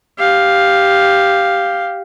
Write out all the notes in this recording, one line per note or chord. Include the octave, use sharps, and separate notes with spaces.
G4 F5